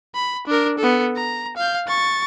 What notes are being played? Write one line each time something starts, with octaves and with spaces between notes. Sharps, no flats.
B5
D4 A#4
B3 A4
A#5
F5 G6
C#6 A6